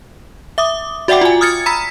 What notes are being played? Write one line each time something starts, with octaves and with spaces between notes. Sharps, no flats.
E5 D6 D#6
F#4 D5 E5 F#5 G5 D6
F4 G#5
D#6 F6 G#6 A6 C#7
A#5 B5 E6 B6